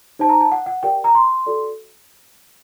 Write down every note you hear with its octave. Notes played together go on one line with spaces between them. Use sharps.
D#4 G4 C5 A5
A#5
A5
F#5
F#5
G4 A#4 D5 G5
A#5
C6
F#4 A4 D5